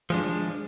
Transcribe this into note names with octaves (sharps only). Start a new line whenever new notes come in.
F3 G#3 D4